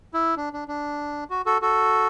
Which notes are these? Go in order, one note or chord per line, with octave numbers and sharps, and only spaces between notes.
E4
D4
D4
D4
F#4
F#4 A4
F#4 A4